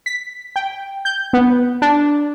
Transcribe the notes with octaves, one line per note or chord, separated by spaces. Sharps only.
B6
G5
G6
B3
D4